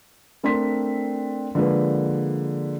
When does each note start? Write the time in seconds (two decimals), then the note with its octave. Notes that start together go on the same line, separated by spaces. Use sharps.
0.43 A3 C4 D4 A#4 C6 B6
1.55 D3 F3 G#3 A#3 D4 B4